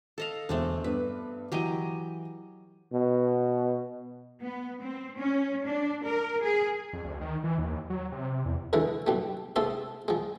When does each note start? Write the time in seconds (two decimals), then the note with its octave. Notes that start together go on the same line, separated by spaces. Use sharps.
0.18 A4 D#5 F5
0.49 E1 A3 C4 D4
0.84 G2 B3 B4
1.52 E3 F#3 G4 D#5 D#7
2.93 B2
4.42 B3
4.81 C4
5.17 C#4
5.66 D4
6.03 A#4
6.42 G#4
6.93 F2
7.05 D2
7.21 D#3
7.44 E3
7.58 D#2
7.90 F#3
8.12 C3
8.45 E2
8.73 D3 E3 F3 G#3 A3
9.07 B1 G3 A3
9.56 G#2 C3 A3 A4 C5 C6
10.08 F3 G#3